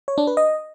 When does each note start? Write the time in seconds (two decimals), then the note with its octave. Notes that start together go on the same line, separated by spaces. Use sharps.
0.08 C#5
0.18 D4
0.27 B4
0.37 D#5